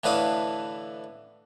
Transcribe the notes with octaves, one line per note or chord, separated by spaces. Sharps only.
A2 D3 E3 B4 F5 D#6